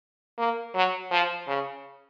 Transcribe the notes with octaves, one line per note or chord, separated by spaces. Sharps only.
A#3
F#3
F3
C#3